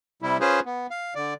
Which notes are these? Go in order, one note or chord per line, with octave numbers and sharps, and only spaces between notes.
C3 G3 E4
C#4 F4 G#4 B4 C5
B3
F5
D3 D5